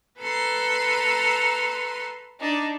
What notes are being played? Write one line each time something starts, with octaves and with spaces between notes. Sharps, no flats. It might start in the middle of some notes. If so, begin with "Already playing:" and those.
A4 B4 A#5 C6
D4 D#4